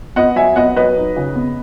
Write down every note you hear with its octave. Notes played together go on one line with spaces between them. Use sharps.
B3 D#5 F#5
F#3 E5 G#5
B3 D#5 F#5
F#3 B4 D#5
D#4
C#3
B3